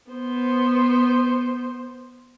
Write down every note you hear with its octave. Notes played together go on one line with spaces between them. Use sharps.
B3 C5